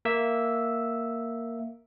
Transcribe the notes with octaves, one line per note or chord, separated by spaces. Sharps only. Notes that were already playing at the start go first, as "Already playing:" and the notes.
A#3 E5 E6